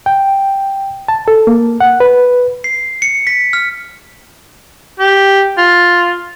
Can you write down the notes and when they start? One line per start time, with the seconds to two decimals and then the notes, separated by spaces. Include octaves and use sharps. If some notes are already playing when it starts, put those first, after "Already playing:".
0.06 G5
1.08 A5
1.28 A4
1.47 A#3
1.80 F#5
2.00 B4
2.64 C7
3.02 C#7
3.27 B6
3.53 F6
4.99 G4
5.58 F4